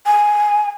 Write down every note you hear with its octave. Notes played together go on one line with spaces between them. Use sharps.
G#5